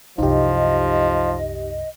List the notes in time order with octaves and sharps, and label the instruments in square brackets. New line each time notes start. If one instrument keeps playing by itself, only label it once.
[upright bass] C2 F#2 [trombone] F3 [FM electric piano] D#4 G4 [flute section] D#5